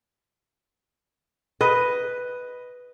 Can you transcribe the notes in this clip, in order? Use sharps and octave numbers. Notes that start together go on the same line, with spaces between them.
B4 D#5